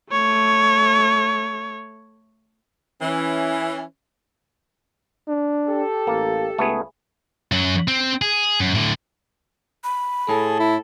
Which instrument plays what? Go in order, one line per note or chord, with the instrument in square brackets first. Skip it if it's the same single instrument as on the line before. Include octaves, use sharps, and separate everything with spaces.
[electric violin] A3 C#5
[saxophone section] E3 C#4
[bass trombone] D4
[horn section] G4 A4
[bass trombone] A1 [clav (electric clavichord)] A#3
[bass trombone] C#2 [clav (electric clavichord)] A3 B3 G#4
[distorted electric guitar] F#2 F#3
C4
G#4
F#2
A2 D3
[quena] B5
[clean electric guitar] A2 [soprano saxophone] G#4 [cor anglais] A4
[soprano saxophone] E4